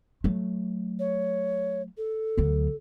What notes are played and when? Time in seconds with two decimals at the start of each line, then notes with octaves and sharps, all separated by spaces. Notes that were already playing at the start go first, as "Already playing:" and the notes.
0.24 F#3 A3
0.99 C#5
1.97 A4
2.37 D2 F#3